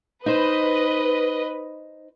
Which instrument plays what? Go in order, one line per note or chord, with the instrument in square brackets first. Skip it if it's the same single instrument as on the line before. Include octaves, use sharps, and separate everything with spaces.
[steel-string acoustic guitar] D#4 C5 [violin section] B4 D#5